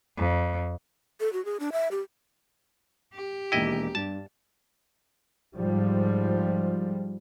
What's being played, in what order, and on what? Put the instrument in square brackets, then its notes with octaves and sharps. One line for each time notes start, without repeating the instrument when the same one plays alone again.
[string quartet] F2
[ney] A4
F#4
G#4
D4
E5
G4
[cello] G4
[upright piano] E1 D#2 G5 [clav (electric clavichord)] E4 D#5
[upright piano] G2 [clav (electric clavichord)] A5
[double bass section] G#2 F3 G3